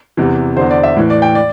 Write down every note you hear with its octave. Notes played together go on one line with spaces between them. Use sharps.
E2 C3 E3
E2 D3 C5
D5
E5
A2 E3
D5
G5
D5